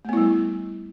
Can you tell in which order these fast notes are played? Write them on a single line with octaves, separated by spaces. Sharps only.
A3 B3 E4 G3